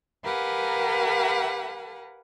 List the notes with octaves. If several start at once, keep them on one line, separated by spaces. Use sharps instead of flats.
G4 A#4 B4 F5 F#5 G#5